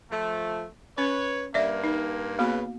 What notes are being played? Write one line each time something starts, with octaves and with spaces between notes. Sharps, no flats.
F3 A3
C#4 B4 C#5
G2 A#3 D5 E5
D#4
C#3 A#3 B3 F#4 B4